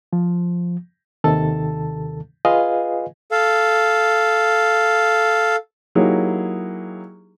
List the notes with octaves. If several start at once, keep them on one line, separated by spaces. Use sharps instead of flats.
F3
D#2 C3 D#3 A4 A5 A6
F4 G#4 B4 D#5 F5 G#5
A4 F5
F#3 A#3 D#4 E4 G4 G#4